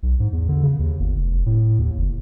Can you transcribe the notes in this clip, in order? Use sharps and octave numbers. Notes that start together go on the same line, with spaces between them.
B1
G#2
E2
D3
C#3
D#2
G1
F1
A2
D#2
F#1